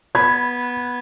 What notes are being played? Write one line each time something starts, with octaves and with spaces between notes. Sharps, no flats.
B3 B5 G#6